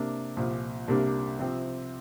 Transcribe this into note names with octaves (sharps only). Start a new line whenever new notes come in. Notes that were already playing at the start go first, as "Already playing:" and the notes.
Already playing: C3 A#3 D4
C2 A#2 F3
C2 C3 G3 A#3 D4
C3 F3 C4